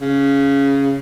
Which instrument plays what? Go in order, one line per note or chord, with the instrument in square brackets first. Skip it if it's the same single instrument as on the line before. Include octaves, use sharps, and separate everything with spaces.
[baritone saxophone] C#3